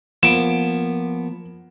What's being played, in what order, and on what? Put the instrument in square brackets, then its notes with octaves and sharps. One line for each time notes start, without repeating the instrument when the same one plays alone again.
[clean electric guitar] F3 A#3 B3 [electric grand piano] D7 E7